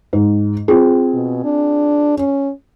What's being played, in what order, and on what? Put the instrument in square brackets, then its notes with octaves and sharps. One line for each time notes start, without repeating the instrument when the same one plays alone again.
[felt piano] G#2
C4 F4 G#4
[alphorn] B2
D4
C#4